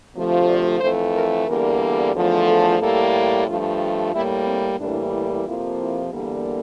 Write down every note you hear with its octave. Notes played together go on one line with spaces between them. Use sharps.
D2 C3 F3 A3
D5
F2 E3 A3 C5
A#4
E2 D3 G3 A#3 A#4
E2 D3 F3 A3
A4
A2 G3 A#3 A4
G2 F3 A3 F4
G4
A2 G3 A#3 E4
C4
A2 E3 G3 A#3 D4
F2 C3 F3 A#3 E4
E4
E2 D3 G3 A#3